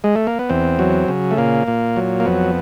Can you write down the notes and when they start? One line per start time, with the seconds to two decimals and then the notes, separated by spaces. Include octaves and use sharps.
0.04 G#3
0.16 A3
0.27 A#3
0.39 B3
0.49 E2 C4
0.79 F#3
1.08 C#3
1.31 A3
1.38 A#2 A#3
1.68 A#2
1.96 F#3
2.20 A#3
2.25 F2 B3